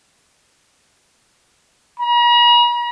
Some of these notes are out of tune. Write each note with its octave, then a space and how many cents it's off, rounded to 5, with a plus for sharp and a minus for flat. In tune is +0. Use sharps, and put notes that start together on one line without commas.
A#5 +45